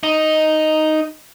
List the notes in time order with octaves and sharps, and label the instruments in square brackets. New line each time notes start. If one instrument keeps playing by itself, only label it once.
[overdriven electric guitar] D#4